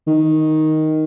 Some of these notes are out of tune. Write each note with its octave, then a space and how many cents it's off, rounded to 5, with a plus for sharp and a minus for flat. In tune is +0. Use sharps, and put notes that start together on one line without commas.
D#3 +5